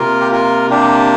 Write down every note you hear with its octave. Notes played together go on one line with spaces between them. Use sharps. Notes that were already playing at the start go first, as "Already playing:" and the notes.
Already playing: C3 A#3 F4 A#4
G4
F4 A#4
D4 G4